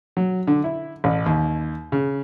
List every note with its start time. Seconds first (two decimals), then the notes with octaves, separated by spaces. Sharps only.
0.17 F#3
0.47 D3
0.64 E4
1.04 A1
1.26 D#2
1.92 C#3